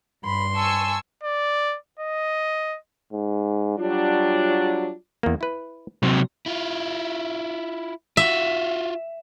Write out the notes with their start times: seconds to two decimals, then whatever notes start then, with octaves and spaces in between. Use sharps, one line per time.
0.24 G2 B5 C6
0.55 G#5 A5 C#6 E6
1.23 D5
2.00 D#5
3.13 G#2
3.79 F#3 G3 D4 F4
5.23 E2 A#3
5.41 E4 B4
6.03 C3 F#3 C5
6.46 E4 F4
8.17 F4 F#4 E5